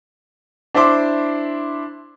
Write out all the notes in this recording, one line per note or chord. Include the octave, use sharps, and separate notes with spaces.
D4 E4 C5 E5 C6 D6